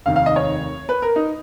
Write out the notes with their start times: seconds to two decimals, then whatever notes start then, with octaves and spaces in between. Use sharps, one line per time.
0.06 F1 D#2 D#3 F5
0.16 F5
0.26 D#5
0.36 C#5
0.89 B4
1.02 A#4
1.16 D#4